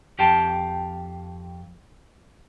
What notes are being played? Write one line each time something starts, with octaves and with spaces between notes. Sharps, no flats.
F2 G4 F5 G5 A5